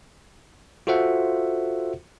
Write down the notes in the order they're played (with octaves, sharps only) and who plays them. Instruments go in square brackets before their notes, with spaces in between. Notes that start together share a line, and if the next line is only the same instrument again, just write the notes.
[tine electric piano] F4 F#4 A4 C5 E5 F#5